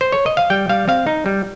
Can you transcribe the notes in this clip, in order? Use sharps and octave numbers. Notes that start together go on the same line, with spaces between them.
C5
C#5
D#5
F5
G3 G5
G3 F5
C4 F5
D#4
G3